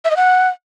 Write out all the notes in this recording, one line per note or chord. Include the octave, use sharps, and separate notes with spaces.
E5
D#5
F#5